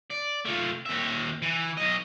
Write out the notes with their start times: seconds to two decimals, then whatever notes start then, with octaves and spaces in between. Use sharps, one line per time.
0.10 D5
0.45 A3 F4
0.86 D#2 E5
1.42 E3
1.78 B1 D#5